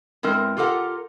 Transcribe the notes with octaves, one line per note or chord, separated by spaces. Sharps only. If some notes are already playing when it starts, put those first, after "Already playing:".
E2 G#3 C4 A#4
F4 G4 A4 A#4 F#5